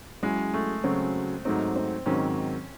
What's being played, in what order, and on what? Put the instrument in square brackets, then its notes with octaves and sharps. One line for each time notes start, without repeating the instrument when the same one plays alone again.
[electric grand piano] F#3 C#4 E4 G#4 [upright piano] G#3
[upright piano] A3
[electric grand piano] C#3 F#3 C#4 F#4 A4 [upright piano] C4
[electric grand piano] G#2 F#3 A3 D#4 [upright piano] C4
[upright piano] C4
[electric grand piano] G#2 D#3 F#3 C4 [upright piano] C#4